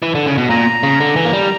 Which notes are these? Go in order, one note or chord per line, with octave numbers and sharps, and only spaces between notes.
E3
D3
C#3
B2
A#2 A#5
C#3
D3
E3
A#3
G3